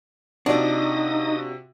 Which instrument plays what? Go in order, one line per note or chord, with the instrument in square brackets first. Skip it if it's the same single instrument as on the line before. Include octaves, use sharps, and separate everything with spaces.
[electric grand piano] C3 F4 F#4 [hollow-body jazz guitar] D4 [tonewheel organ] D#4 D#6